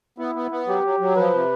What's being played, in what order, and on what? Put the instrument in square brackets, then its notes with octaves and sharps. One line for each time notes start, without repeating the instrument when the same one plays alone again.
[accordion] B3 [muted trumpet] E4
[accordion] B3
B3
[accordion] F#3 [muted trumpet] G4
[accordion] F#3
F#3
[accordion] F3 [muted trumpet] B4
[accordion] C3